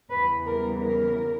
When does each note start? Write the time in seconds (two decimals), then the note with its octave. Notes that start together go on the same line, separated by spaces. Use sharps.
0.10 E2 C#3 E3 G3 B3 B4
0.46 A#4
0.83 A#4